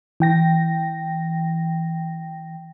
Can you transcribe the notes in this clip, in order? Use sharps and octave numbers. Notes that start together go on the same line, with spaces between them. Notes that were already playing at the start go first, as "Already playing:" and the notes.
E3 G5 A#6